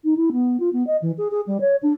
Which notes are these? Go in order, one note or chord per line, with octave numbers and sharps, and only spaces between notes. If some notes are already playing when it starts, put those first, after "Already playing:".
D#4
E4
B3
F4
B3
D#5
E3
G#4
G#4
G3
C#5
D4